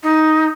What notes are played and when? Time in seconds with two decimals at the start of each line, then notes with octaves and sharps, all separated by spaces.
0.03 D#4